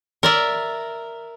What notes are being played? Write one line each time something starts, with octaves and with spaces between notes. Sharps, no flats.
A#4 D5 E5